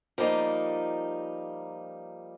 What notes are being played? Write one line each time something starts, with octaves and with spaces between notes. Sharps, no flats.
F3 G3 A#3 D#4